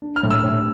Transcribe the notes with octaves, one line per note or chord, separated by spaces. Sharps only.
D4
F6
A2
E6
A2